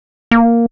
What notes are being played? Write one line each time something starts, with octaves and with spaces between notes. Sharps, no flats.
A#3